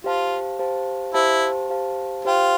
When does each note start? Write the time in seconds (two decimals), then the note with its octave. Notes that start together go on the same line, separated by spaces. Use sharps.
0.04 F4 G4 C5 F5 A5
0.59 G4 C5 F5 A5
1.14 E4 G4 C5 F5 A5
1.69 G4 C5 F5 A5
2.25 F4 G4 C5 G5